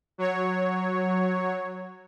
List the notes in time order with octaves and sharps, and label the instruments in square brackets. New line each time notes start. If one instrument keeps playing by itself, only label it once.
[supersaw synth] F#3 C#5